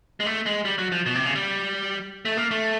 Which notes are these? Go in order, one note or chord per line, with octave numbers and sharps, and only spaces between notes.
G#3
A3
G#3
G3
F#3
F3
B2
C3
C#3
G3
A3
A#3
A3